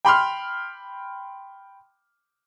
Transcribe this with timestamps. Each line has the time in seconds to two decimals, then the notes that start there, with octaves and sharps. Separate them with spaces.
0.05 G5 B5 C6 F6